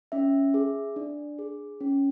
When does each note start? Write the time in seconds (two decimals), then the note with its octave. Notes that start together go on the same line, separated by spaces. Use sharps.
0.12 C#4 E5
0.54 G#4
0.96 D4
1.39 G#4
1.80 C#4